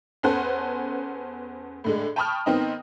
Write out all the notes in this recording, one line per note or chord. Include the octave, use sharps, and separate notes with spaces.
E2 C#4 A4 B4 C5 F#5
A2 D3 G#3
G5 A5 B5 C#6 D#6 F6
D#3 B3 C4 D#4